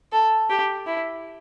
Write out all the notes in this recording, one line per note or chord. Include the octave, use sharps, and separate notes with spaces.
A4
G4
E4